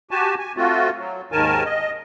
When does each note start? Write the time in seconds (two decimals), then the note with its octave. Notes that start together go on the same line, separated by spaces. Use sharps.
0.11 F#4 G4 G#5 A5
0.38 G#5
0.57 A3 C4 F4 F#4
0.98 F#3
1.32 D#2 G#2 D#3 A#4 G#5 A5
1.65 D#5